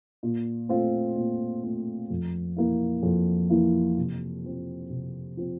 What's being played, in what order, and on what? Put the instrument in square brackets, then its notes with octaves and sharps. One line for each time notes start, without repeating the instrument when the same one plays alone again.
[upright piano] A#2
A3 C4 F4
A#2
A3 C4 F4
F2
E3 A#3 E4
F2
E3 A#3 E4
C3
F3 C4
C3
F3 C4